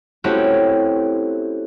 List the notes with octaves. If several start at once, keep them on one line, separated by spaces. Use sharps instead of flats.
A3 C4 C#4 E4 F#4 G4